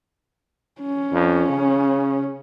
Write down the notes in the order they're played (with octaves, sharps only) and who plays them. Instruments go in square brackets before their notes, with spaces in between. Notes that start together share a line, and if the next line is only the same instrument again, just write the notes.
[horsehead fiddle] C#4
[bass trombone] F2
C#3